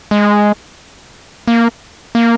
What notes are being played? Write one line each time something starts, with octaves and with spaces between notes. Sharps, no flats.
G#3
A#3
A#3